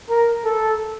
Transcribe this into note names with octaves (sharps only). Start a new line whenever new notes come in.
A#4
A4